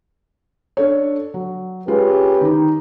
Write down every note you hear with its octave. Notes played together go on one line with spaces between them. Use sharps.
D4 A4 C#5
F#3
G#3 C#4 F4 G4 B4
D#3 D#4